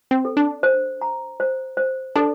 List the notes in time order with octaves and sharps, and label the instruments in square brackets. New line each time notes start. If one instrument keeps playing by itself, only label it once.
[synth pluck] C4
[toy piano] A4
[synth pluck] D4
[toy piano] C5
A#5
C5
C5
[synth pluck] D4 [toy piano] A4